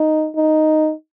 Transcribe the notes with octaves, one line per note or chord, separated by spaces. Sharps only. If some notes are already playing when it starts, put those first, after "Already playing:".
Already playing: D#4
D#4